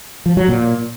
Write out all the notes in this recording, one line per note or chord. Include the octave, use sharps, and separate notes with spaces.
F3
F#3
A#2